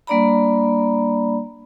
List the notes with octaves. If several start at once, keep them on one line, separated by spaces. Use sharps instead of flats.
G3 A#3 D4 D5 A#5 B5